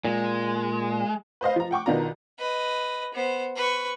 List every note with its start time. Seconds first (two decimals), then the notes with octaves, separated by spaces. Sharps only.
0.05 A#2 G#3
1.41 B4 C5 D#5 F5
1.56 F3 A#5
1.71 F#5 G5 C#6 D6
1.86 B1 D#3 B3 D4 F4 A#5
2.39 B4 D#5
3.14 B3 C5
3.56 B4 C#6